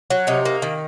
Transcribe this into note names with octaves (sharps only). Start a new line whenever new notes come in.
F#3
C3 D#4
A#3
D#3